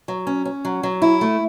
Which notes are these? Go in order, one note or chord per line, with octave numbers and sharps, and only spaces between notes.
F#3
C#4
C#4
F#3
F#3
E4
A3